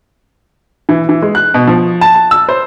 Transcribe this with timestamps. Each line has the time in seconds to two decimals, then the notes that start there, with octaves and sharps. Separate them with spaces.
0.89 E3
1.09 E3
1.22 G#3
1.35 F#6
1.54 B2
1.67 F3
2.01 A5
2.15 A5
2.31 E6
2.48 C5